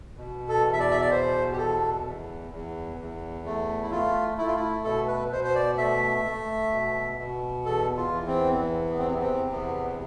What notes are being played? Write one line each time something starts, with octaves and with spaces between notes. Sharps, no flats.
B2
A4
E2
E5
D5
E5
D5
B2 C5
G4
E2 A4
E2
E2
E2
A3
E4
A3 F4
A3 E4
F4
E4
B2 A4
B4
B2 C5
C5
D5
A3 E5
A3
B2
B2
E2 A4
F4
E3
C4
E2
B3
C4
C3 B3
C4
E2 B3